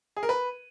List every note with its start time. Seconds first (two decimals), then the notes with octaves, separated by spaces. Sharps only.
0.17 G#4
0.23 A#4
0.29 B4